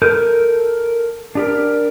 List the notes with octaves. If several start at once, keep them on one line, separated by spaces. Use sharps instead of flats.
A4 A#4 G6
D4 G4 A#4